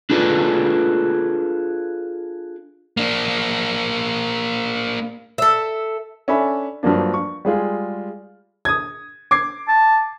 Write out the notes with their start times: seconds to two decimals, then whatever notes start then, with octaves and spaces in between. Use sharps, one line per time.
0.10 D4 F4 G#4 A4 B4 D5
2.97 A#3 D4
5.38 A4 E5
6.28 C#4 D4 A4 E5 G#5 B5
6.83 G2 F3 F#3 A#3 D4
7.14 C#6
7.45 G3 G#3 F4 G#4
8.65 D#6 G#6
9.31 D6 G#6 C7
9.68 A5